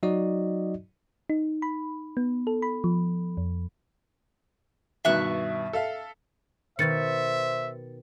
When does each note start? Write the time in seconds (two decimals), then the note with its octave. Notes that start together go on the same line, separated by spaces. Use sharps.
0.03 F#3 D#4 F#4 D5 D#5
1.30 D#4
1.62 B5
2.17 B3
2.47 A4
2.62 B5
2.84 F3
3.37 F2
5.05 G2 B2 D#3 E5 C#6 F#6
5.73 A4 E5 F5
6.79 B2 D#3 C5 E5 A6 C#7